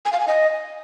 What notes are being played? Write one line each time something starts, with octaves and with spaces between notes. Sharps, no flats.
G#5
F5
G#5
D#5